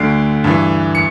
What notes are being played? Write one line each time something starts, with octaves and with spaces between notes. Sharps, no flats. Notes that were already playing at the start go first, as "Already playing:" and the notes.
Already playing: D2 D3 C7 D7
G2 E3
C#7